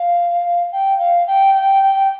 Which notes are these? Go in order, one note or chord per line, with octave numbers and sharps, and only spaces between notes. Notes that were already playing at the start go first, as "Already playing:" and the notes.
Already playing: F5
G5
F5
G5
G5
G5